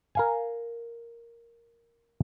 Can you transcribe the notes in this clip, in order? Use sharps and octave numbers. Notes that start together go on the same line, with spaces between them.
A#4 F5 G#5